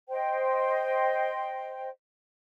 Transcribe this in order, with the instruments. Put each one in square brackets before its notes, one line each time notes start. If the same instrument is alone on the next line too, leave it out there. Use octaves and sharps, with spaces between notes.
[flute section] C5 D#5 G5